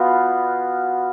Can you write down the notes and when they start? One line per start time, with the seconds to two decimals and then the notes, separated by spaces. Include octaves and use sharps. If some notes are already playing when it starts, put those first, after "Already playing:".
Already playing: B2 B3 F4